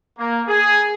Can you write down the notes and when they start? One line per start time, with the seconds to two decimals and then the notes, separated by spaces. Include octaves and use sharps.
0.18 A#3
0.48 G#4